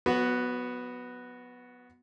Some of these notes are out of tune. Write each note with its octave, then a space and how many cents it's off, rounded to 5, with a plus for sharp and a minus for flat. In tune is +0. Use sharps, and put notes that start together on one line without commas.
F#3 -40 B3 +0 F#4 +0